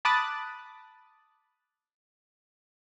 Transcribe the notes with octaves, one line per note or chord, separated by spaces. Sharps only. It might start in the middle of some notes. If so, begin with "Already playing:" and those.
A5 B5 D6 D#6 F#6 A6